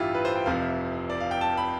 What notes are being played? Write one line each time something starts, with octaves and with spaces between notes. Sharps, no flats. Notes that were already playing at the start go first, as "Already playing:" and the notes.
Already playing: A1 G2 E3 E4 F4 G4
B4
C5
G5
F1 F2 C3 F3 F5
E5
D5
F5
G5
A5
B5